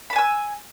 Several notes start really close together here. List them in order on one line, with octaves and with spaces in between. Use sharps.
B5 A5 G#5 E6